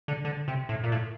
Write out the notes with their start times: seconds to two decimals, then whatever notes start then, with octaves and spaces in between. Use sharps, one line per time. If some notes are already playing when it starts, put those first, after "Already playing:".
0.08 D3
0.25 D3
0.48 C3
0.69 A2
0.84 A#2
0.92 A2